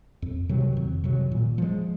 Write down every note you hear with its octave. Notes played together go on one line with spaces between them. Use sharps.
F2
C3 D#3 F#3
F2
C3 D#3 F#3
A#2
F3 G#3